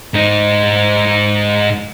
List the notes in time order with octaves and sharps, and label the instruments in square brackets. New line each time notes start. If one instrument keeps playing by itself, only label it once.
[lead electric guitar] G#2 D#4